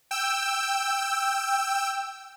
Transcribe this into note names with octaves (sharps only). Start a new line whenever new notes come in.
G5 E6